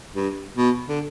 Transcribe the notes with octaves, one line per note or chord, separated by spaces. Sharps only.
G2
B2
D3